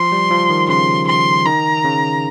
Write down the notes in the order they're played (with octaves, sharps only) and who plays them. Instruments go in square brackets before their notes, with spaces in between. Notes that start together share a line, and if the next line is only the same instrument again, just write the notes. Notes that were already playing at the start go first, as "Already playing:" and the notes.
Already playing: [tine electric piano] F3 [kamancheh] C6
[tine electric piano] G3
F3
D#3
[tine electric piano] C#3 [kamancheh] C6
[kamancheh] C6
[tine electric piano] D#3 [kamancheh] A#5
[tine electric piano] C#3